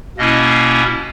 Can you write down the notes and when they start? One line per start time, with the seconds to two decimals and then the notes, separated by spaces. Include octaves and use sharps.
0.18 B2 A#3 C#4 E4 D#5